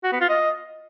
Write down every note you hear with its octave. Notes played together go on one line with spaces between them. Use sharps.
F#4
B3
F4
D#5